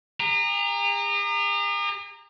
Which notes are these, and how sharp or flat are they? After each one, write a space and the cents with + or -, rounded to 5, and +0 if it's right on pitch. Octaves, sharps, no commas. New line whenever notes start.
G#4 -45 A#5 -10